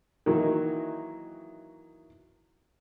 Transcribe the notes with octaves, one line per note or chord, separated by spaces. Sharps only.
D#3 E3 F#3 A#3 D#4 F#4